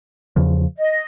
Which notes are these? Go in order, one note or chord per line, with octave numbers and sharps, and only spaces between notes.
E2 C#3 F3
D#5